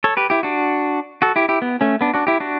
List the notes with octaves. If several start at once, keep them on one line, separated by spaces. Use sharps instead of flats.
A4 C#5
G4 B4
E4 G4
D4 F#4
F#4 A4
E4 G4
E4 G4
B3
A3 C#4
B3 D4
D4 F#4
E4 G4
D4 F#4